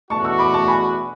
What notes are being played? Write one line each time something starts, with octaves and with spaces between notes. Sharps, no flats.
E2 B2 A3 D4 F#4 A5 C#6
C#6 E6
B5 D6
A5 C#6
G#5 B5